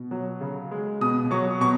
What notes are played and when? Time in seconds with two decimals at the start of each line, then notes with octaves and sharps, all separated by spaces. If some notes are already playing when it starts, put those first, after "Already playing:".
Already playing: B2
0.11 F#3
0.41 C#3
0.71 G#3
1.01 B2 D#6
1.31 F#3 C#6
1.61 B2 C#6